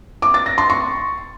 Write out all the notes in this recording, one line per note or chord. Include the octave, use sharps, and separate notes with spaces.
D6
A6
A#6
C6
C#6